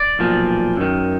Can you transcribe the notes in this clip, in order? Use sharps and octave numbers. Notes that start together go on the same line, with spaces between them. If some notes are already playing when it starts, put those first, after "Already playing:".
Already playing: D5
B1 A#2 F3
F#2 D#3